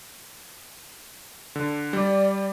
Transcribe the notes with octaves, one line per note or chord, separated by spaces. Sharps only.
D3
G3 D5